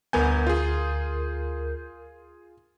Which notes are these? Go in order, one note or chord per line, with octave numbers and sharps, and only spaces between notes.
G1 D2 B3 A#4 G#5 G6
F4 G#4